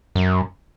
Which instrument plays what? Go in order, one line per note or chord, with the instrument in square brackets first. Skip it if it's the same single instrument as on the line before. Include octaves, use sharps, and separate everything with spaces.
[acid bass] F#2